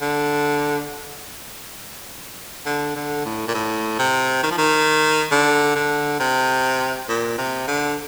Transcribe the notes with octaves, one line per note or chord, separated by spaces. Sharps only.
D3
D3
D3
A2
A#2
A2
C3
D#3
F3
D#3
D3
D3
C3
A#2
C3
D3